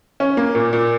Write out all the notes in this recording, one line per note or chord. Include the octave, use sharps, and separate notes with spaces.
C#4
A#3
A#2
A#2